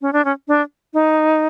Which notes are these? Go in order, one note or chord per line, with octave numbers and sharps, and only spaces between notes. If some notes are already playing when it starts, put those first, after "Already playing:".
C#4
D4
C#4
D4
D#4